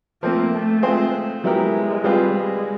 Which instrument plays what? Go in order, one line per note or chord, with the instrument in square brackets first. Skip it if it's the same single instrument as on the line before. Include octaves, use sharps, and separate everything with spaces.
[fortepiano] F3 A3 C4 [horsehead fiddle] A#3
[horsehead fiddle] A3
[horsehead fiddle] G#3 [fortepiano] A3 C4 F4 G#4 C5
[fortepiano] F#3 B3 E4 G4 A#4 [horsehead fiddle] G#3
[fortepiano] G3 C4 F4 G#4 B4
[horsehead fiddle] G#3